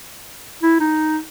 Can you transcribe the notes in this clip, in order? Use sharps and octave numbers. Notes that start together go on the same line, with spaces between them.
E4
D#4